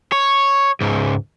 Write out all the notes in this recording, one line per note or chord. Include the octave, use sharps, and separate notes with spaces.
C#5
C#2 G#2